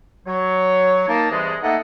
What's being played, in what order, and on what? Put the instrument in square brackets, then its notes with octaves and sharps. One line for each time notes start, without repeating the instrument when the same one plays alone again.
[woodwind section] F#3 C#5
A#3 D#4 A5
C3 E3 G3 G#3
A3 A#3 D#4 A4 D#5 F#5